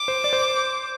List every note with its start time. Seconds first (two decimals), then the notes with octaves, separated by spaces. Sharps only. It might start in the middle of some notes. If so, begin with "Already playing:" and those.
Already playing: D6
0.08 C5
0.24 D5
0.33 C5